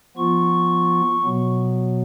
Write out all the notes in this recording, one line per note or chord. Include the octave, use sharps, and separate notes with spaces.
F3 B3 F4 C#6
B2 F#3 B3